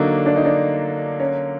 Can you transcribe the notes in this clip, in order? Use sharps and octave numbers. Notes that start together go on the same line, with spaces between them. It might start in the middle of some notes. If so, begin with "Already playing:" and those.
Already playing: D3 F#3 A#3 D4 D#4
D4
D#4
D4
C#4